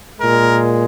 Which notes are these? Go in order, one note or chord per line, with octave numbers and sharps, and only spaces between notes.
A#2 G#3 A#4